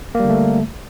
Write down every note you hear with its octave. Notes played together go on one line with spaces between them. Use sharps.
D3 G3 A3 A#3